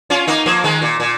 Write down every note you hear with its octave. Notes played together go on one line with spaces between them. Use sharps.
C#4 F4
A#3 D#4
F3 A#3
D#3 G#3
A#2
A#2